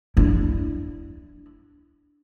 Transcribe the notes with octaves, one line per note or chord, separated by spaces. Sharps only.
D4 E4